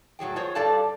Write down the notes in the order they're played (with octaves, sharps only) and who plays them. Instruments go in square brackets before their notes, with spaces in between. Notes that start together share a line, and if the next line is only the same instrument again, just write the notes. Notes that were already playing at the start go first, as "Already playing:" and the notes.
[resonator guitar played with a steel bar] A2 F#3 G#4 G5
F4 G#4 C5 C#5
G2 G3 A4 D5 F5 A5